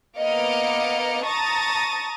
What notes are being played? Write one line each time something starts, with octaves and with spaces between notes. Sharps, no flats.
A#3 B3 D#5 D6 F6 C#7
A5 A#5 C#6 D#6 A6 A#6